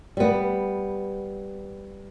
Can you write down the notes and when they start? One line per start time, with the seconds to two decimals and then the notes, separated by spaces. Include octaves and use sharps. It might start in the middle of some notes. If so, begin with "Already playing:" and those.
0.17 G3 B3